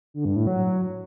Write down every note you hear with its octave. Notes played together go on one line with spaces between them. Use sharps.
D3
G2
A2
F#3